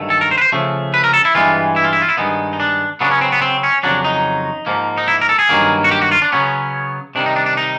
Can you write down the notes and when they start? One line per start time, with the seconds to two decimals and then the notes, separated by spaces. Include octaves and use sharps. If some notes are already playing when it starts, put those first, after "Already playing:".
Already playing: G2 D#3 F#3 A3
0.10 A4
0.21 A#4
0.31 C5
0.38 B4
0.42 C5
0.52 C#3 F3 A3
0.94 B4
1.04 A#4
1.14 A4
1.25 E4
1.35 G2 E3 G#3 B3 F4
1.76 E4
1.84 F4
1.93 E4
2.02 F4
2.09 E4
2.17 G2 D#3 G#3 B3 D#4
2.53 D#4
2.60 D4
3.00 C#3 F#3 B3 D4
3.11 C#4
3.21 C4
3.32 B3
3.42 C4
3.63 C#4
3.83 F2 C#3 F#3 D4
4.04 D#4
4.66 G#2 F3 A#3
4.98 D#4
5.08 E4
5.21 A#4
5.29 A4
5.39 G#4
5.49 G2 D#3 F#3 A#3
5.84 F#4
5.91 G4
6.01 F#4
6.11 F4
6.22 D4
6.32 C#3 F#3 B3 C#4
7.15 C3 D#3 G3 D4
7.26 D#4
7.36 D4
7.46 D4
7.57 D#4